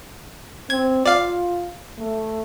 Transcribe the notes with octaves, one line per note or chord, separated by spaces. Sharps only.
C4 G#6
F4 D5 F5
A3